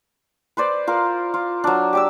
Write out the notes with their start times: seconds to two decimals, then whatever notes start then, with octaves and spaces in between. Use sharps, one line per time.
0.57 B4 C5 D5
0.87 F4 A#4
1.34 F4
1.64 F#3 D4
1.93 G4 D5 E6